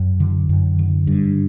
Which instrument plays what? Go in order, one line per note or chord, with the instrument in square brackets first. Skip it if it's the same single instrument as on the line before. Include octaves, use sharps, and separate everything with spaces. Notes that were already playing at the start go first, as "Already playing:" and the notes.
Already playing: [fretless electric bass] F#2
D3
F#2
D3
G2